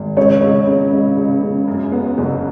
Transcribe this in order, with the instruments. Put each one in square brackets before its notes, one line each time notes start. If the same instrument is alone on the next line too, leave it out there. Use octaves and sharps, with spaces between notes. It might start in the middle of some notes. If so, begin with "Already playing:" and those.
Already playing: [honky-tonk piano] G#1
[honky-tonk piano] C#2 [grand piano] C#5
[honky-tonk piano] C#2
C#3
C#2
C#2
C#3
F#2
B3
F#1